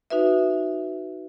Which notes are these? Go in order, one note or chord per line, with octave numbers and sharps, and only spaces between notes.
D#4 F#4 B4 E5